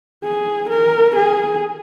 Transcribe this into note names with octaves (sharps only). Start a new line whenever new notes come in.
G#4
A#4
G#4